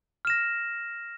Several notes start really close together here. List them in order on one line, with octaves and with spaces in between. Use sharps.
F6 E7 A#6